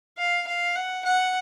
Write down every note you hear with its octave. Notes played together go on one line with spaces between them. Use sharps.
F5
F5
F#5
F#5